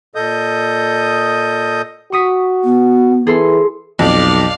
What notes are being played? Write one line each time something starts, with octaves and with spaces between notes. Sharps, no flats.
A#2 A4 D#5 D#6 G6
F#4 C#6 D#6 B6
B3
E3 G#4 A4 C6
B1 F2 D5 F5